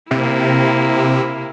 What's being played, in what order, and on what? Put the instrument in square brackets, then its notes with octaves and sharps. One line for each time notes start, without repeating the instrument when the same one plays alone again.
[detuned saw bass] C3 [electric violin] A#3 E4